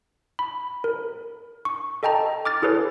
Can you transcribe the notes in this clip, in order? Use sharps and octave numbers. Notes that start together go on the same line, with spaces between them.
B5
A#4
C#6
A4 D#5 G5 A5 A#5
D6 F6 A6
E4 G#4 A4 B4 C#5